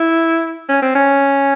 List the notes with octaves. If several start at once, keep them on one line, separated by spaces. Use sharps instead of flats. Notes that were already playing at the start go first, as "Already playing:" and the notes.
Already playing: E4
C#4
C4
C#4